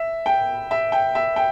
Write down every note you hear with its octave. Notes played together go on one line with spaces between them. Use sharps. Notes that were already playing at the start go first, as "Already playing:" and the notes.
Already playing: E5
G5
E5
G5
E5
G5